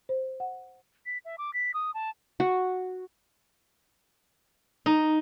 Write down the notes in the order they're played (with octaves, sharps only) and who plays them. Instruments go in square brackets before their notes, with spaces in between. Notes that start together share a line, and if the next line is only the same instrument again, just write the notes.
[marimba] C5
F#5
[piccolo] B6
E5
D6
B6
D#6
A5
[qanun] F#4
[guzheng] D#4